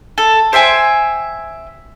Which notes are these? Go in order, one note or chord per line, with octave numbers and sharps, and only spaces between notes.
A4
C5 E5 G5 G#5